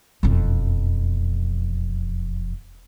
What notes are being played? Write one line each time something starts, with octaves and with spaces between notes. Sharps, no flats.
E1 F2